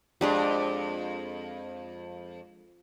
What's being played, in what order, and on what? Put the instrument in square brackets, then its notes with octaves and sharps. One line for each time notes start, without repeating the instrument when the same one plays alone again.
[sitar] F2 [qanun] G#3 D4 G4